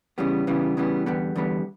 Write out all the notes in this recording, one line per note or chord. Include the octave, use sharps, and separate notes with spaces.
C#3 E3 G3 B3
C#3 E3 G3 B3
C#3 E3 G3 B3
E2 D3 G3 B3
E2 D3 G3 B3